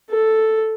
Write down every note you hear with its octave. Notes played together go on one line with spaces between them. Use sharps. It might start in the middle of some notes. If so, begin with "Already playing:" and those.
A4